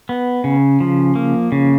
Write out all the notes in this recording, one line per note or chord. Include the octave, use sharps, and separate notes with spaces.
B3
C#3
F3
A#3
C#3